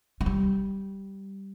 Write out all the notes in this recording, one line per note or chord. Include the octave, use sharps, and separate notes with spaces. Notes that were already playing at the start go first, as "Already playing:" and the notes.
A3
G3